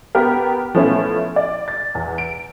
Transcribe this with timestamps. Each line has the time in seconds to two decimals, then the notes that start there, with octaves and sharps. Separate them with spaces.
0.15 B3 G4 A#4
0.75 F3 A3 B3 C#4 E4 F4
1.36 D5
1.68 A6
1.95 E2
2.18 D7